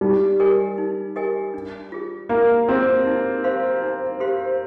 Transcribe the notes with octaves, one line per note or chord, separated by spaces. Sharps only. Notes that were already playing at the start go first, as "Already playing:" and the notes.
G3 D#4
G4 A#4 D#5 G#5
D#4
G4 A#4 D#5 G#5
D4
F4 G#4
A#3 D4
C4 F4 G#4
D#4
G4 C5 F5 C6
D#4
G4 C5 F5 C6